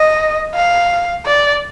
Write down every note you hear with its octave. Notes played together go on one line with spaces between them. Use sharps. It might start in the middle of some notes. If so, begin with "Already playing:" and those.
Already playing: D#5
F5
D5